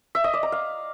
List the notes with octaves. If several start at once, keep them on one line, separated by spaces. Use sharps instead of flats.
E5
D#5
D5
A#5
F5